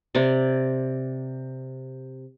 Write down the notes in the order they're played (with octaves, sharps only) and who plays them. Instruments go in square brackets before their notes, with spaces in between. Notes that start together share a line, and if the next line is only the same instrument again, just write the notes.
[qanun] C3 D5